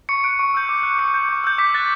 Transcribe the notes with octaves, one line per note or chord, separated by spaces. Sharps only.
C#6 C#7
F#6 D7
C#6
E6 G6
D6
F#6
D6 C#7
G6
C#6
E6 G6
D6 B6
F#6 A6